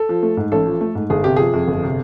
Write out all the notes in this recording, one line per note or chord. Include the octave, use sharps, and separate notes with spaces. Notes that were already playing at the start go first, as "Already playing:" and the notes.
Already playing: A4
F3
A3
G#2
A1 A4
F3
A3
G#2
G1 G#4
C3 G4
F3 G#4
F2
G1
C3